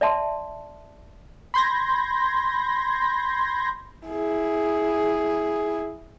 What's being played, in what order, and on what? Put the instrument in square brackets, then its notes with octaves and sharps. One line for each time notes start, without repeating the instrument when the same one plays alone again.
[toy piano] D5 E5 A5 C6
[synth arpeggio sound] B5 C6 G6 G#6 A#6
[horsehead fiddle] E4 G#4